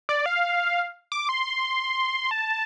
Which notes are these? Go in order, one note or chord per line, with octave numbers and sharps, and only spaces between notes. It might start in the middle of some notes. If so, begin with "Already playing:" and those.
D5
F5
D6
C6
A5